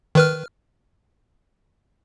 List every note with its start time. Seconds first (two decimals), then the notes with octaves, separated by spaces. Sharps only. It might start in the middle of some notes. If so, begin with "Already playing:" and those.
0.15 D#3 B4 F6